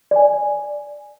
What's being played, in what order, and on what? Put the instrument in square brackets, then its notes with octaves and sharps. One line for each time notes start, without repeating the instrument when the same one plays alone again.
[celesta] D5 G#5